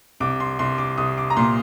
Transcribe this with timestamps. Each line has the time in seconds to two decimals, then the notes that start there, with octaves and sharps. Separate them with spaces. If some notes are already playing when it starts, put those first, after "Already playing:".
0.20 C2 D6
0.40 C6
0.59 C2 C6
0.78 D6
0.98 C2 D#6
1.18 D6
1.30 A#5
1.37 A#2 C6